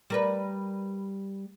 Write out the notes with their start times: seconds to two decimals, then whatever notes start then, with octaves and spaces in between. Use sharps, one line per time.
0.10 G3 A#4 B4